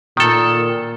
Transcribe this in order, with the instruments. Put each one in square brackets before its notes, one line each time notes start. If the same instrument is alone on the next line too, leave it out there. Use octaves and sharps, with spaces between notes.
[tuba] A#2 [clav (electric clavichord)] D#3 A4